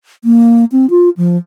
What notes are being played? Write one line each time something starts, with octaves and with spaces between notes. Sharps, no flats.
A#3
C4
F4
F3